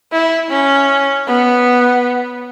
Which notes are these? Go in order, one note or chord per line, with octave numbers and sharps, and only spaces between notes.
E4
C#4
B3